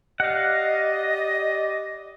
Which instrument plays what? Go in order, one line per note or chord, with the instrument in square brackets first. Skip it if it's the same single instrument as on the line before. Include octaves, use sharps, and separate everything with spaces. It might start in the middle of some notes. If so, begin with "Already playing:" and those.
[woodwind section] G4 D5 D#5 [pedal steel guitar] F5 F#5